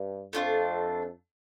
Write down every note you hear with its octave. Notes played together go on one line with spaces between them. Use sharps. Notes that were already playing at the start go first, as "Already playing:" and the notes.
Already playing: G2
F2 A3 D4 F4